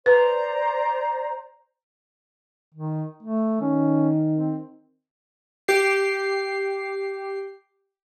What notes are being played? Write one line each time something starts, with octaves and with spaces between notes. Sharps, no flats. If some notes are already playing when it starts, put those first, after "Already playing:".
B4 C5 D5 A#5
D#3
A3
D#3 C#4
C4
G4 C7